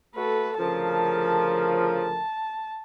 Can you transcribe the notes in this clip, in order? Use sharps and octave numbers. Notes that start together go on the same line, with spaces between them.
A3 F#4 A4 B4
D2 C#3 F3 A4 A#4 A5
A5